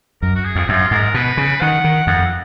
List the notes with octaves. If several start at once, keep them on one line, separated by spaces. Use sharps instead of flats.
F#2 A#4
F#4
G#4
F2
F#2 F4
G#2 A#4
B2 B4
C#3
D#3 F#5
D#3
F2 F#5